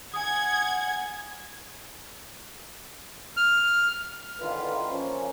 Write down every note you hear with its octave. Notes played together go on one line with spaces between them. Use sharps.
F#5 G#5 D#6 G#6
F6
A1 D3 D#3 A#3 F4 B4
F3 A#3 C#4